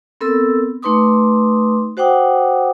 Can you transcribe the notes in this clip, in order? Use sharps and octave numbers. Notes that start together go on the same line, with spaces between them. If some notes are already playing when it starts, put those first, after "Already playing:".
B3 C4 A4 A#4 E6
A3 D#4 B4 C6 D6 D#6
F#4 C5 F#5 G5 D6 D#6